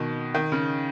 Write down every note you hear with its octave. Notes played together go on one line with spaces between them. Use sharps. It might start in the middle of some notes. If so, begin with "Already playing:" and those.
Already playing: B2 D#3
D#3
C#3